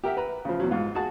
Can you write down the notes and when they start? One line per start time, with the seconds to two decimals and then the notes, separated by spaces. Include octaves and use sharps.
0.04 G4 A#4 E5 F#5
0.17 B4 A#5
0.45 C#3 F3
0.60 E2 F#3
0.71 G#2 F4
0.95 F#4 G#4 A5